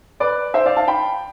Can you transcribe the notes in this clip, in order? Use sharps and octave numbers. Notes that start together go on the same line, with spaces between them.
B4 D5
C5 E5
D5 F5
F5 A5
G5 B5